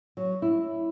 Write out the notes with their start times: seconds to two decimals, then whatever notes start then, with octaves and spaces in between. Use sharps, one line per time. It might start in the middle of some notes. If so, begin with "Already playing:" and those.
0.17 F#3
0.42 E4